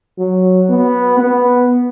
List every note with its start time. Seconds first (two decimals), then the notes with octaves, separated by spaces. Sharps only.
0.18 F#3
0.69 B3
1.19 B3